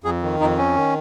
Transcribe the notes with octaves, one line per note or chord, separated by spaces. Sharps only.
F2 G#4
D#3
F2 D#4
C#4
D#3